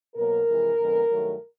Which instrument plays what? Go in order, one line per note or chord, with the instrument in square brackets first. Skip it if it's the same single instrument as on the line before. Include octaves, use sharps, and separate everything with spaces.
[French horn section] B2 F#3 A#3 A#4
F2 C3 E3 G#3
F2 D3 F3 G#3 B3
G2 D#3 F#3 A3